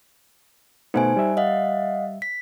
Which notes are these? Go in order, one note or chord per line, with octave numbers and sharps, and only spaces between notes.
B2 A3 B3 D#4 C5 G#5
G3 E5
D#5 F5 F#5
B6